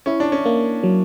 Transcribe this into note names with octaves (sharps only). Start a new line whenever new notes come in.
C#4 E4
D4
C#4
A#3
F#3